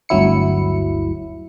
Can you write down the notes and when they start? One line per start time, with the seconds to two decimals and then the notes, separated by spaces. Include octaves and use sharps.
0.09 G1 D2 F#3 E4 C#7